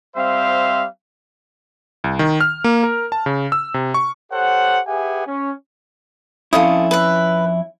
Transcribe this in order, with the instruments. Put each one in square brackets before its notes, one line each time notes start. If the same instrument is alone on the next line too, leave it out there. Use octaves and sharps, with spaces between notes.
[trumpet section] G3 C4 C5 E5 F5
[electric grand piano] C2
D#3
F6
A#3
A#4
A5
C#3
E6
C3
C#6
[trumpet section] G4 A4 C5 C#5 F#5
G4 G#4 B4 E5 F#5 G#5
C#4
[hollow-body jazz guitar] F2 C#4 E4 [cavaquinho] F4 A4 D#6
[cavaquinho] B4 E5